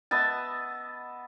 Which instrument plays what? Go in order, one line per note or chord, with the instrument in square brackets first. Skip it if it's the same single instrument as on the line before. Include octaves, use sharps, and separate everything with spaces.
[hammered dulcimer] B3 D#5 E5 A5